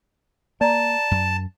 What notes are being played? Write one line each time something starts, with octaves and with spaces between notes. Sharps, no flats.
A#3 D5 A5 A#5
F#2